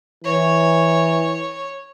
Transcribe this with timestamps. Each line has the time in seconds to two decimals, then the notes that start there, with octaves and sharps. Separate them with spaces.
0.24 E3 C#5